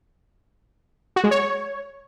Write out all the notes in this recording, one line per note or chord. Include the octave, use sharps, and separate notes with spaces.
F#4
G#3
C#5